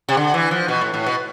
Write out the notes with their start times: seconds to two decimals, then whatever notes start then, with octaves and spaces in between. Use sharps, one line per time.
0.09 C3
0.17 D3
0.34 E3
0.51 F3
0.68 B2
0.81 A2
0.94 A2
1.06 B2